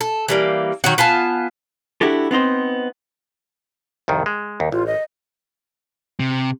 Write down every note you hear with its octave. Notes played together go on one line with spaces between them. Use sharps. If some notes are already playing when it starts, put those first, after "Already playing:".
A4
E3 G3 A#3
D#3 F#3 F#4
B3 F4 G#5 A5
D4 E4 F#4 G4 A4
B3 C4 D#4 C5
C2 F2 D#3
G#3
D#2
A1 F4
D#5
C3